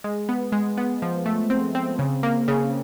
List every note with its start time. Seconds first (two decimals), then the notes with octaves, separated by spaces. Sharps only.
0.04 G#3
0.29 B3
0.52 G#3
0.78 B3
1.02 F3
1.26 A3
1.50 C4
1.75 C4
1.99 C#3
2.23 A#3
2.48 C#3